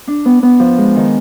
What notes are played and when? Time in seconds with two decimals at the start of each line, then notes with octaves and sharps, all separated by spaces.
0.07 D4
0.25 B3
0.43 B3
0.59 F3
0.78 G#3
0.96 D#3